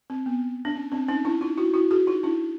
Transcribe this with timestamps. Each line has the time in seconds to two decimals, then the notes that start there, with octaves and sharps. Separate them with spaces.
0.10 C4
0.26 B3
0.65 D4
0.76 C#4
0.92 C4 D4
1.08 C#4 D#4
1.25 D4 E4
1.41 D#4 F4
1.58 E4 F#4
1.74 E4 F#4
1.91 F#4 G#4
2.07 D#4 F4
2.23 D4 E4